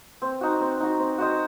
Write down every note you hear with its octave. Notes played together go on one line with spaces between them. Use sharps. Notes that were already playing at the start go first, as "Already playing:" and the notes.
C4
D#4 F#4
C4
D#4 F#4
C4
F#4 C5 D#5